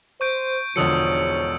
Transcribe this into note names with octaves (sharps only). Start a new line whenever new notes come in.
C5 C#6 G6 D7
E1 G#2 D3 F3 C#5 D#6 E6 C#7